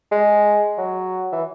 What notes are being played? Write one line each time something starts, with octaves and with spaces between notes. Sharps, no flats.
G#3
F#3
E3